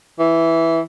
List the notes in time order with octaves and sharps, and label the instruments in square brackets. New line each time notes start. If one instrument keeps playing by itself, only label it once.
[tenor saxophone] E3